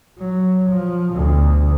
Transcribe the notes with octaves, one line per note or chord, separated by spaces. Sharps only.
F#3
F3
D2 B2